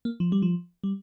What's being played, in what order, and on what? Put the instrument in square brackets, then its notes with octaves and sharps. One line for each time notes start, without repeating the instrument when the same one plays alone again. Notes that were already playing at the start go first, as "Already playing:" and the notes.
[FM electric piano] A#3
F3
G3
F3
G3